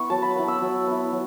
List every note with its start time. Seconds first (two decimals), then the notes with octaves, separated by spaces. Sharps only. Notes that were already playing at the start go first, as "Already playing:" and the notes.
Already playing: B3 E4 C#6
0.10 F#3 A5
0.22 B5
0.36 B3 E4
0.48 E6
0.62 F#3
0.87 B3 E4
1.12 F#3